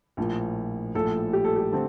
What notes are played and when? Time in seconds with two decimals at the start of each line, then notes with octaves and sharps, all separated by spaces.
0.17 A#1 A2 F3 A#3
0.95 A#1 A2 F3 A4
1.33 G4
1.45 A4
1.56 G4
1.72 D3 A3 C4